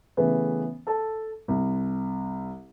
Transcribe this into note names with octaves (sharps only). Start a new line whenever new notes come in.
C#3 E3 A3 B3
A4 A5
C2